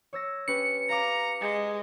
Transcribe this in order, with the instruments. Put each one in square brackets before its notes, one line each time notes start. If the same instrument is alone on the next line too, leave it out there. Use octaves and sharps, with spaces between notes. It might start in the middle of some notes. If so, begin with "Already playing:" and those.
[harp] C#5 E6 A#6
[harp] C#4 G4 B4 [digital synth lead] C#7
[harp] F5 D6 [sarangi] A#5
[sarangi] G#3